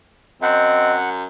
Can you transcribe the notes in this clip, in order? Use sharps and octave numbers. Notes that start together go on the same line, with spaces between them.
F#2 C4 D#5 F#5